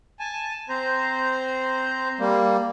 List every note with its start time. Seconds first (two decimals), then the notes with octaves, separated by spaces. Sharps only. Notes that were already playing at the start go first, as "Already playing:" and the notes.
0.19 G#5 A5
0.69 C4 C5 A#5
2.19 G3 A#3